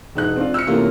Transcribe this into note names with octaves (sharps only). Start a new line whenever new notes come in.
E1 D#4 F#6
C4 D4 F4
E6 F6 C#7
C3 E3 A3 A#3 C#4 F4